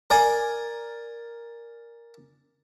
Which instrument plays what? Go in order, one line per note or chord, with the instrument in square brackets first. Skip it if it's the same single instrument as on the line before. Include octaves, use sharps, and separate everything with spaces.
[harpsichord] A#4 D5 G#5